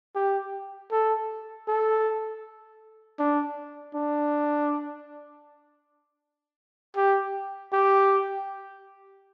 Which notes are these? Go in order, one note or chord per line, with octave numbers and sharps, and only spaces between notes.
G4
A4
A4
D4
D4
G4
G4